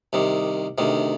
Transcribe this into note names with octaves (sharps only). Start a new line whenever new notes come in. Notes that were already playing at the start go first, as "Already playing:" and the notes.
C2 C3 D#3
D2 C3 D#3